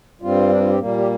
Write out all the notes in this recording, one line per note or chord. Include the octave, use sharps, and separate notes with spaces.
G2 G3 C4 F4
D4
F4
G4
A#2 G3 A#3
G4